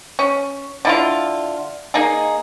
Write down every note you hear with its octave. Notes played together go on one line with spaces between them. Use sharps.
C#4
D3 E4 F4
A#3 D#4 G#4